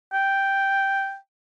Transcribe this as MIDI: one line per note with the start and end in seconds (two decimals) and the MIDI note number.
0.13 1.16 79